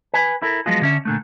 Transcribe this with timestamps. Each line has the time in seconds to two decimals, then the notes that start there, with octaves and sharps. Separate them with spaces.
0.14 B4 G#5
0.42 E4 A4 A#4
0.66 F3 F#3 G#3 B3 F4 F#4
0.81 D3 C#4 E5
1.05 A#2 D3 A3